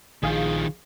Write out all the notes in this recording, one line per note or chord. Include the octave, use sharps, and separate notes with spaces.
A#1 D#3 F3 G#4 F5